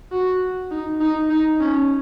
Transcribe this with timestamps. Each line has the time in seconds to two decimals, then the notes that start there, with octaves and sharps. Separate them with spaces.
0.12 F#4
0.71 D#4
1.01 D#4
1.30 D#4
1.60 C#4